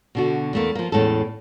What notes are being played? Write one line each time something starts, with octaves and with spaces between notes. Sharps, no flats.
B2 D3 F#4
E2 A3 A#3
F3 A#3
E2 A2 G#3 C#4 A4